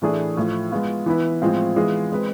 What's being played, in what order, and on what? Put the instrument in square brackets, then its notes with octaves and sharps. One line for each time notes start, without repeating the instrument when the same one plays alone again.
[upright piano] A2 E3 A3 D4 G#4
A2 F3 A3
G#3 B3 F4
E3 B3 E4 B4
A2 F3 G#3 C4 F4
E3 G#3 B3 F4 G#4
G#3 C4 G#4 B4